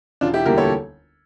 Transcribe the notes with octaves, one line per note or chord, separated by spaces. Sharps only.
E1 D4 F4
E4 G4
D2 D3 G3 A#3 G4 A#4
A4 C#5